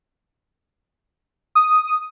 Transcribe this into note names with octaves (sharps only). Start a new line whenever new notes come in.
D#6